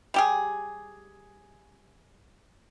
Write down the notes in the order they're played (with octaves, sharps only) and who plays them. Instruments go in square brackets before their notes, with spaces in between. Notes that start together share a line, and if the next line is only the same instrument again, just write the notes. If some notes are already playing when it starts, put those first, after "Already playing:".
[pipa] G3 G4 G#4